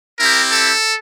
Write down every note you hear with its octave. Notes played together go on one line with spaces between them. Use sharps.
C4 E4 G4 A#4
A4